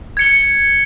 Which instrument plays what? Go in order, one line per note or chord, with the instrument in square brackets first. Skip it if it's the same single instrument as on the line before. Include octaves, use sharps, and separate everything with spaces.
[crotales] G#6 C#7 G7